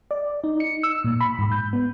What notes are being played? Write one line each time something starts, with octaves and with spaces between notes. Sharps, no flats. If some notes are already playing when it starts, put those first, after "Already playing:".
D5
D#4
C#7
E6
A#2
B5
G#2
G6
B3